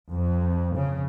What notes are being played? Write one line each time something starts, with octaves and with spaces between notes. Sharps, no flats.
F2
C#3